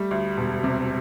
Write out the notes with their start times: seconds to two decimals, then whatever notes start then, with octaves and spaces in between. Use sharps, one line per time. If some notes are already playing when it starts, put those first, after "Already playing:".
Already playing: G3 A3
0.11 D2
0.37 E1
0.63 C3